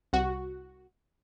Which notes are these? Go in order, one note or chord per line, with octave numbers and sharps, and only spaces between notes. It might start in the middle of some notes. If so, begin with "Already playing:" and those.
C2 F#4